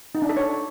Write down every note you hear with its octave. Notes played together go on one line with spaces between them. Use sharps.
D#4
D4
A4
C#5